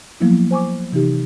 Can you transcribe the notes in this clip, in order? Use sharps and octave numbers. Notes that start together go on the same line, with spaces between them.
F3 F#3 A#3 B3 E4
C5 G#5 C#6 D6
C3 E3 D#4 G4